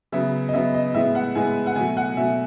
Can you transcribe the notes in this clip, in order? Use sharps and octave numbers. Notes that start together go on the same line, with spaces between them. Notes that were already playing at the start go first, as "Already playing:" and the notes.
C#3 F#3 B3 E5
D#5
C#3 F#3 B3 E5
D#5
A2 G#3 B3 E5
F#5
A2 G#3 B3 G#5
F#5
B2 F#3 A3 G#5
F#5
B2 F#3 A3 E5